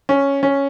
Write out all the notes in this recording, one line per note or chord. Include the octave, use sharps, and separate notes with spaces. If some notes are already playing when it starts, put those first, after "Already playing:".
C#4
C#4